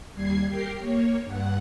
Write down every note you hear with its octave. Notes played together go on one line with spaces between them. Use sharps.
D#2 G3 G#6 C7
G4 A#4 G5 C7
A#3 C#5
G2 F#5